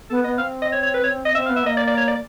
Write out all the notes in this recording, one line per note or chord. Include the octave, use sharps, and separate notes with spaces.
B3 A4
B3 D#5
C4 F5
D#5
C#5
C#5
B4
C#5
D#5
C4 E5
F5
B3
E5
A#3 D#5
D5
D5
C#5
D5